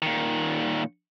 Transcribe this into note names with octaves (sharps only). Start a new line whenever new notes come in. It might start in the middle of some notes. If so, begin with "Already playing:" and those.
A#2 D#3